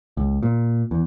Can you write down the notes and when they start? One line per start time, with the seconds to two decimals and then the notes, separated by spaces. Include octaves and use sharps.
0.17 C#2
0.43 A#2
0.91 E2